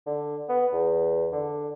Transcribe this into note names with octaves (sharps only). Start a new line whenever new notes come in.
D3
B3
E2
D3